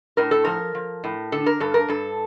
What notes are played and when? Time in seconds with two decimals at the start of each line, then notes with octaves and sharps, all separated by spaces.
0.17 A2 A#4
0.31 A4
0.45 F3 A#4
0.75 F3
1.04 A2
1.32 D3 A4
1.46 A#4
1.60 G2 A4
1.74 A#4
1.88 G2 A4